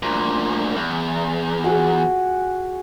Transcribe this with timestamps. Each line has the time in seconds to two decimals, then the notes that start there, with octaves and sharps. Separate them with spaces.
0.03 D2 A#2
0.76 E2
1.64 F#4 G#4